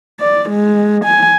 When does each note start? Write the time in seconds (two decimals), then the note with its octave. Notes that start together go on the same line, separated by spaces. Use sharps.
0.20 D5
0.50 G#3
1.04 G#5